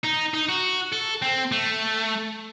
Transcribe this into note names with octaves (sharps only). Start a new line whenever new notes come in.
D#4
D#4
F#4
A4
C4
A3